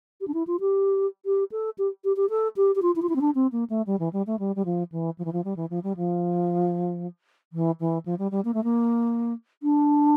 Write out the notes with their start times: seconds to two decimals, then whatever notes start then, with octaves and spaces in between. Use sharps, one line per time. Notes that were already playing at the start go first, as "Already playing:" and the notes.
0.21 G4
0.28 D4
0.34 E4
0.47 F4
0.60 G4
1.26 G4
1.52 A4
1.78 G4
2.04 G4
2.16 G4
2.30 A4
2.56 G4
2.75 G4
2.82 F4
2.96 E4
3.02 F4
3.09 E4
3.16 C4
3.21 D4
3.35 C4
3.52 A#3
3.70 A3
3.87 G3
3.99 E3
4.13 G3
4.27 A3
4.39 G3
4.56 G3
4.65 F3
4.92 E3
5.18 F3
5.25 E3
5.33 F3
5.44 G3
5.57 E3
5.70 F3
5.84 G3
5.97 F3
7.53 E3
7.80 E3
8.06 F3
8.19 G3
8.31 G3
8.45 A#3
8.54 A3
8.64 A#3
9.63 D4